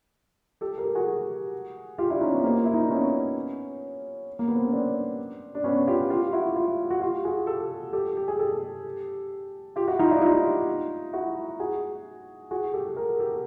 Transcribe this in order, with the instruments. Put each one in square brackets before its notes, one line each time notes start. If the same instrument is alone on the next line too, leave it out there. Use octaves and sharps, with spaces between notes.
[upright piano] G4 A4
A#4
G4 A4
F#4 G#4
F4 G4
D4 E4
C#4 D#4
B3
A#3 C4
F4
E4
D#4
D4
B3 C#4
A#3
B3
C4
C#4
C4 D4
D4
B3 C#4
F4 G4
F4 G4
E4 F#4
F4 G4
F#4
F4 G4
F#4 G#4
G4 A4
G4 A4
G4
G#4
G4 A4
F4 G4
E4 F#4
D#4 F4
D4 E4
D#4 F4
E4 F#4
F#4 G#4
F#4 G#4
G4 A4
G#4 A#4
G4 A4